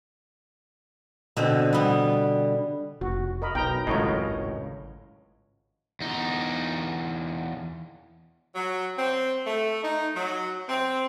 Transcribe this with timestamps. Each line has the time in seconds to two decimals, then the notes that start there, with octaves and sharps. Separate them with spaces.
1.37 B2 D3 C4
1.73 G3 B3
3.01 F1 F#4
3.42 A#4 D#5 B5
3.55 B1 G5 A#5
3.87 G#1 C#2 F#2 A2 A#4 C#5 D#5
6.00 E2 D#4
8.55 F#3
8.97 C4
9.46 A3
9.83 D#4
10.14 F#3
10.68 C4